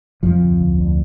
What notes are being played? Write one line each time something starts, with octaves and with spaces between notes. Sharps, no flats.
F2 C3 F3
D2
D2
D2